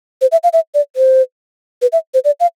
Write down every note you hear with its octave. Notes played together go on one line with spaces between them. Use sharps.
C5
E5
F5
E5
D5
C5
B4
E5
C5
D5
F5